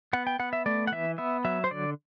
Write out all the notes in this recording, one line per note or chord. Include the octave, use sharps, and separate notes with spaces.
B3 F#5
G5
B3 F#5
E5
A3 D5
F#5
E3 E5
B3 E5
F#3 E5
C5
D3 D5